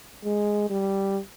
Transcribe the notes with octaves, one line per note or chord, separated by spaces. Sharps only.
G#3
G3